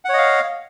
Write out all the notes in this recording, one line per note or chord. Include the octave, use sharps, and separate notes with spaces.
C#5 D#5 F5 F#5